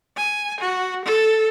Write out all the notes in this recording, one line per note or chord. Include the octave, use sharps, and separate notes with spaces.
G#5
F#4
A4